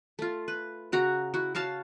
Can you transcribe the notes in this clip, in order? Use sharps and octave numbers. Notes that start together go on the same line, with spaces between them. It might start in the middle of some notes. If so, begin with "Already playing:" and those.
A3 F4
B4
C#3 F#4 A#5
E4 F#4
F#4 C#5 F5 A5